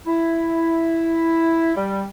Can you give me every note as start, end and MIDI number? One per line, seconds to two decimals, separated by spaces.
0.06 1.74 64
1.75 2.04 55